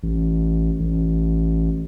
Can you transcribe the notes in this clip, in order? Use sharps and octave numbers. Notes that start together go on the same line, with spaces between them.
A1
A1